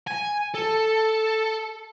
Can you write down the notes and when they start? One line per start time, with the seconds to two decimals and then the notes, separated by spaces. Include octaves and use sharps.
0.07 G#5
0.54 A4